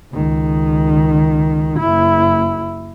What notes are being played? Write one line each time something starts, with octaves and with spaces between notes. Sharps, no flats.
C#2 D#3
F#1 E4